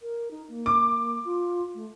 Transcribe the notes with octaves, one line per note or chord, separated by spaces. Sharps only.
A#4
D#4
A#3
D6
F4
A3